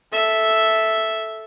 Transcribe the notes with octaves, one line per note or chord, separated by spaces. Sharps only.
A4 E5